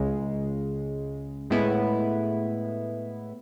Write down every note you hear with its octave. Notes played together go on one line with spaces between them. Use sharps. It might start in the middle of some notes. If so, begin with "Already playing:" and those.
Already playing: C#2 C#3 G#3
A2 G#3 B3 E4